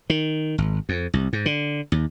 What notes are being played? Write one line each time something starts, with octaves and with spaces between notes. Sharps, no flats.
D#3
G#1
F2
C2
G#2
D3
D#2